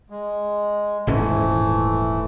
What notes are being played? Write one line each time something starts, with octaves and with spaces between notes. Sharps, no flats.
G#3
D#1 G#2 E3 A3 C#4